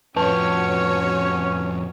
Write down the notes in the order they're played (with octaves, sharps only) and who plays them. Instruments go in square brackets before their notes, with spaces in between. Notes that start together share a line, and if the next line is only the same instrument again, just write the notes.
[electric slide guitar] F2 A2 [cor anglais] C#4 [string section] F#4 C#5 [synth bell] B4 A5